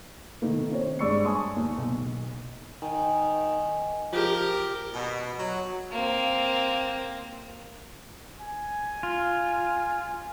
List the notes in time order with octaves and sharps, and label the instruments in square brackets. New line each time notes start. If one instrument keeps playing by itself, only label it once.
[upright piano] B2 D#3 A3 A#3
C4 C#5
G2 G#3 D5 C#6 E6 C#7
G#5 A5 C6 C#6 D#6
D#2
B1
[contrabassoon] D#3 [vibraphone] D#5 G#5
[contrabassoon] F3 [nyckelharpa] G4 A#4
[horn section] B2
F#3
[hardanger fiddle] A#3 C4
[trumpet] G#5
[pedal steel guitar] F4